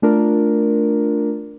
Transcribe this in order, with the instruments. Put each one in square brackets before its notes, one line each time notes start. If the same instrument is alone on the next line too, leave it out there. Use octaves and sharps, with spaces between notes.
[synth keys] A3 D4 F4 A#4